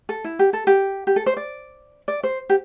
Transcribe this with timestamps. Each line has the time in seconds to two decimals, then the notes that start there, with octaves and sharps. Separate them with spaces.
0.09 A4
0.24 E4
0.39 G4
0.53 A4
0.67 G4
1.07 G4
1.16 A4
1.26 C5
1.37 D5
2.08 D5
2.23 C5
2.50 G4